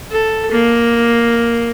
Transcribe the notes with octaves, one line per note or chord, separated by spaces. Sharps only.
A4
A#3